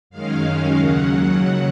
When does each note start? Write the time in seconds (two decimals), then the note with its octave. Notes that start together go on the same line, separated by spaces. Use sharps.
0.10 F#2 D#3 G#3 C#4 F5
0.43 F5
0.78 D#2 C#3 F#3 F#5